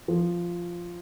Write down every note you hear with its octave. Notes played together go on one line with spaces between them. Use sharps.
F3